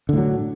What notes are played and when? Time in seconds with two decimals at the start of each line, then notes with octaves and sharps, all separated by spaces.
0.09 D3
0.13 A2
0.18 F#3